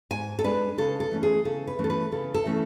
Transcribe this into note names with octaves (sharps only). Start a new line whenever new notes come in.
G#2 G#5
A4
G#3 D4 B4
C#3 A4
A4
E3 A3 C#4
G#4
C#3 A4
B4
E3 A3 C#4
A4
B4
C#3 A4
A4
E3 A3 C#4